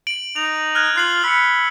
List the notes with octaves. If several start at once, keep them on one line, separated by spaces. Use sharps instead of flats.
D7 F#7
D#4 F7
F6 F#6 G#6
F4 F#6 C7 F#7
B5 E6 C#7